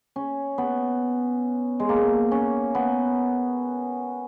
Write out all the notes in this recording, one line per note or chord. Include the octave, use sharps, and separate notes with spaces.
C#4
B3
G#3
A#3
C#4
B3